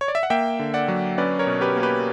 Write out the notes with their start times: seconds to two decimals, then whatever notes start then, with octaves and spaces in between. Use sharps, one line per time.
0.01 C#5
0.08 D5
0.15 E5
0.23 F#5
0.30 A#3 E5 G5
0.59 D3
0.74 D5 F#5
0.88 F#3
1.18 C#4 B4 D5
1.39 A#4 C#5
1.47 B2
1.61 G4 B4
1.77 A#3
1.83 G4 B4